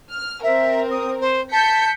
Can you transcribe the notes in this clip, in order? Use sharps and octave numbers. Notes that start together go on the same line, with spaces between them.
F6
C4 A#4 E5
D#6
C5
A5 G6 B6 C#7